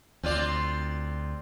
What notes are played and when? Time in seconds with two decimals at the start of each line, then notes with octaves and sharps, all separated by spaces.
0.23 D2 C4 F4 D5